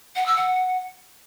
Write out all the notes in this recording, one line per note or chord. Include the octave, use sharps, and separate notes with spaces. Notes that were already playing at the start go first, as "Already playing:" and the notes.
F#5
E6
F#5